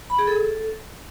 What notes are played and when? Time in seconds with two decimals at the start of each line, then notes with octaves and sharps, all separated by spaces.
0.10 B5
0.19 G#4
0.27 A4